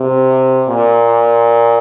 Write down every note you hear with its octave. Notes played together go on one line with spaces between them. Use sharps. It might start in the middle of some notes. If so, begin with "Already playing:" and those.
Already playing: C3
A#2